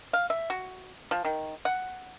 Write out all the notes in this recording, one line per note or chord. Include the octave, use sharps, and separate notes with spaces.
F5
E5
F#4
F3
D#3
F#5